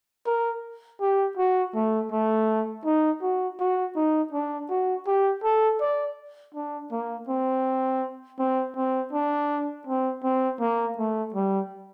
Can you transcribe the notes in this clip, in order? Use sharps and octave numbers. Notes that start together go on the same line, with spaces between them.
A#4
G4
F#4
A3
A3
D#4
F#4
F#4
D#4
D4
F#4
G4
A4
D5
D4
A#3
C4
C4
C4
D4
C4
C4
A#3
A3
G3